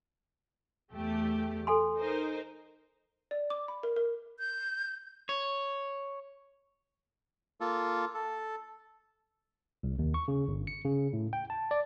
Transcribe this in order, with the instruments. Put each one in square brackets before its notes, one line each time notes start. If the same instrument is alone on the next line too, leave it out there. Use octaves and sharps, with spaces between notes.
[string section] E2 A3 G4
[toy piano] A4 G#5 C6
[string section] D#4 A#4 C5
[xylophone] D5
D6
B5
A#4
A#4
[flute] G6
[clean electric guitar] C#5
[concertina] A#3 F4 A4
A4
[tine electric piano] C2
D#2
C#6
C#3
G1
C#7
C#3
A2
G5
A5
D5